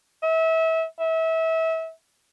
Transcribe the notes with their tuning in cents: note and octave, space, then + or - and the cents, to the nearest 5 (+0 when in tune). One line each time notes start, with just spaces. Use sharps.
E5 -30
E5 -30